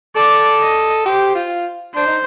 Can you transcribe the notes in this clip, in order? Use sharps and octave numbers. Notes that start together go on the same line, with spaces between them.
A4 D5
D#5
G4 C5
F4
D4 C5
D#4